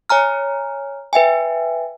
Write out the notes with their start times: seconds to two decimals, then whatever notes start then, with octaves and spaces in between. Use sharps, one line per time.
0.09 C#5 G#5 A#5 F6
1.13 B4 E5 G5 G#5